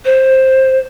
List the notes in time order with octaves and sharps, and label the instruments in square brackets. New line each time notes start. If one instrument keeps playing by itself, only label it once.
[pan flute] C5